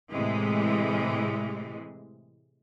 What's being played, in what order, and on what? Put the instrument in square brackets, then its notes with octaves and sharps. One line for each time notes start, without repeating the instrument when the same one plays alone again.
[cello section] A2 C3 E3 G#3